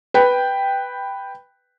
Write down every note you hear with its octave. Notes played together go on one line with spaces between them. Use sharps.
B4 G5